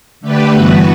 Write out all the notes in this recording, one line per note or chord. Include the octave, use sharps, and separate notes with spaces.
D3 A3 D4 G4 B4
G2 E3 B3 F#4 B4